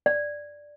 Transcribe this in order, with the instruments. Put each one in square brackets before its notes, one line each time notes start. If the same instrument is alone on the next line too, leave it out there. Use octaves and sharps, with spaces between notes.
[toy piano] D5